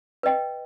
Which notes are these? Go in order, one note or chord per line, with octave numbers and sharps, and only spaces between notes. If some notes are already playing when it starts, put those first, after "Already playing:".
B4 D#5 G5